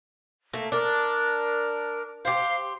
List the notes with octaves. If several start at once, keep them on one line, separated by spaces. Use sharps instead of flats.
A3 A#3
D4 A#4
G4 C5 F5